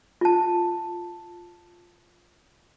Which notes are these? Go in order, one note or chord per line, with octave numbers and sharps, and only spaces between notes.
F4 A5